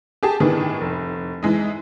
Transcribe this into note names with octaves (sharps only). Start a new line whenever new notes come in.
G4 G#4 A5
A2 D#3 B3 D4 G#4
F1
E3 G#3 D#4